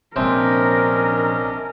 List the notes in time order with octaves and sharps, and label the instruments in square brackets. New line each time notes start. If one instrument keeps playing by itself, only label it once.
[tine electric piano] A#1 C5 [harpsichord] C3 [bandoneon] C#4 D4 D#5 [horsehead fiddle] A#4